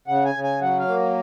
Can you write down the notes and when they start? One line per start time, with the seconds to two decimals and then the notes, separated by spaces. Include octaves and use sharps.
0.07 C#3 F#5
0.25 G#5
0.34 C#3
0.43 G#5
0.61 F#3 F#5
0.79 F5
0.88 A#3